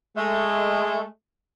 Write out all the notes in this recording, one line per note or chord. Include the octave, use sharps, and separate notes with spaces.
G#3 A3